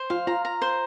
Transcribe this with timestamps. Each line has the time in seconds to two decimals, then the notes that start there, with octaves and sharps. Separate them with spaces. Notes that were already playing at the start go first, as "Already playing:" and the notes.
Already playing: C5
0.10 F4 F5
0.27 F4 A#5
0.45 A#5
0.62 C5